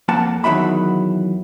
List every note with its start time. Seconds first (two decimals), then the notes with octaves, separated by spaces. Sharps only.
0.08 F2 A#3 F#5 A5
0.44 E2 D#3 F#3 E5 B5